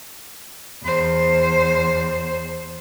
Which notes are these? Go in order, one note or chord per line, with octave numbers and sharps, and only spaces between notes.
E2 C5